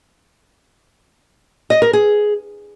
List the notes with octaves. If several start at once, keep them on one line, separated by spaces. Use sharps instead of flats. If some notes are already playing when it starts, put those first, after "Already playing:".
D#5
A#4
G#4